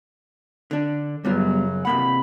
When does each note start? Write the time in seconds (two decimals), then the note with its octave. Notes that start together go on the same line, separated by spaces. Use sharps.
0.71 D3 D4
1.25 F#2 C#3 F#3 G3 B3 F4
1.85 C3 A#3 F#5 B5